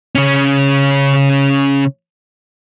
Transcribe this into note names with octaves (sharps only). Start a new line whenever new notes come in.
C#3 C#4